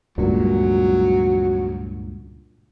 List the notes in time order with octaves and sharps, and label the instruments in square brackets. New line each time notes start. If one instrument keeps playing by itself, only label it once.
[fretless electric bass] C#2 G2 A#2 [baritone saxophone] F#3